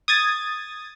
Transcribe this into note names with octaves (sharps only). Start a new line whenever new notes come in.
D#6 G#6 A6